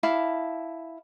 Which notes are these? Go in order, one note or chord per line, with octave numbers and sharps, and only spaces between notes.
E4 F5 A5 D6